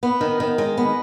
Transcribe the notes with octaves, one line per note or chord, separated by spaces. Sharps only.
B3
D#3
D#3
G#3
B3